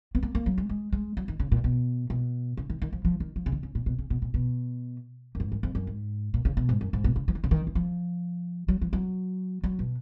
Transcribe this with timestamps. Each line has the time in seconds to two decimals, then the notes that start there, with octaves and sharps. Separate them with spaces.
0.15 B3
0.23 A#3
0.35 A#3
0.46 F#3
0.58 G#3
0.69 G#3
0.93 G#3
1.17 F#3
1.28 D#3
1.40 C#3
1.52 A#2
1.64 B2
2.10 B2
2.57 C#3
2.70 D#3
2.82 D#3
2.93 F3
3.05 F3
3.20 D#3
3.36 F3
3.46 C#3
3.52 D#3
3.63 C#3
3.75 A#2
3.86 B2
3.98 C#3
4.10 B2
4.22 A#2
4.34 B2
5.35 F#2
5.40 G#2
5.52 F#2
5.63 F2
5.75 F#2
5.87 G#2
6.34 A#2
6.45 C#3
6.57 B2
6.69 G#2
6.81 F#2
6.93 G#2
7.04 B2
7.16 C#3
7.28 F3
7.35 D#3
7.44 C#3
7.51 D#3
7.67 D#3
7.75 F3
8.68 F#3
8.82 F3
8.93 F#3
9.64 F#3
9.79 B2